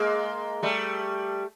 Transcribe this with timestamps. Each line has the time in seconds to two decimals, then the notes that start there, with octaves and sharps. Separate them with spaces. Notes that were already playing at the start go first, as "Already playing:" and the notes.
Already playing: G#3 A#3
0.63 G3 A3